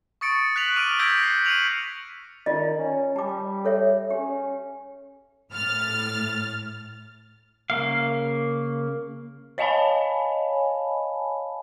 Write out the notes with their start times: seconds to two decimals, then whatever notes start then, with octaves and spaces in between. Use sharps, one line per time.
0.21 C#6 D#6 A6 C#7 D7
0.56 F#6 B6 F7 F#7
0.76 D6 F6 D7 D#7
0.99 E6 G6 G#6 A#6 B6 D7
1.23 C7
1.45 C#7 D#7 F7 F#7
2.46 D#3 F4 D5 D#5
2.76 C#4
3.16 G3 A5 D6
3.65 A4 C#5 E5
4.10 C#4 G4
5.51 A2 F6 A6
7.70 C#3 A#3 F5
9.58 C#5 D#5 F5 G#5 A5 B5